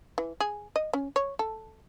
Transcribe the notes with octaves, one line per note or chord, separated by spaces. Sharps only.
E3
G#4
D#5
C#4
C#5
A4